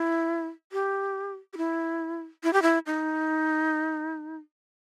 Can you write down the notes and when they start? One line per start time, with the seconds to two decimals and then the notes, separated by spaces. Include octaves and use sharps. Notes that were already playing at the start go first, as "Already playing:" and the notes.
Already playing: E4
0.72 G4
1.53 G4
1.57 E4
2.44 E4
2.53 G4
2.62 E4
2.86 D#4